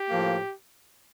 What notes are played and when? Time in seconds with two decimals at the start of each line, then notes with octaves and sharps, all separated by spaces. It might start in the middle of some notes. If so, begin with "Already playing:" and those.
Already playing: G4
0.10 A2 F3 A#3